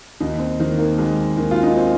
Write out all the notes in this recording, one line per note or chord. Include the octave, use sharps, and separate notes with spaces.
D#2 D#4
C4
D#3 A#3
A#3
D#2 G#3
D#3 A#3
F4
D#4
C4